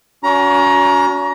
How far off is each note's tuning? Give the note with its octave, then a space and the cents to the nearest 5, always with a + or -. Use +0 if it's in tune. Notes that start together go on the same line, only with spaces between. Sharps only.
C#4 +40 F#4 +0 A#5 +20